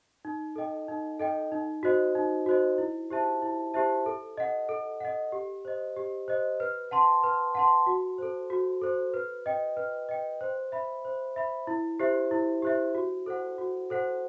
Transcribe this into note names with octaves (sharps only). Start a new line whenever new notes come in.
D#4
A4 D#5 G5
D#4
A4 D#5 G5
D#4
F#4 C5 D#5
D#4
F#4 C5 D#5
E4
G4 C5 E5 A5
E4
G4 C5 E5 A5
A4
D#5 F#5
A4
D#5 F#5
G4
C5 D#5
G4
C5 D#5
B4
F#5 A5 C6
B4
F#5 A5 C6
F#4
A4 C5
F#4
A4 C5
B4
D#5 G5
B4
D#5 G5
C5
E5 B5
C5
E5 B5
E4
G4 C5 E5
E4
G4 C5 E5
F#4
A4 C5 F#5
F#4
A4 C5 F#5